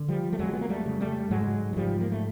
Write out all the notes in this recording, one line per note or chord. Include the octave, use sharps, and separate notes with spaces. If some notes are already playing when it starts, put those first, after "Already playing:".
Already playing: D3
F3 G3
A3
F2 F#3 G#3
B3
A#3
G3 A3
C#3
G3 A3
G#2 F#3 G#3
G#3
G#2 F3 G3
A#3
A3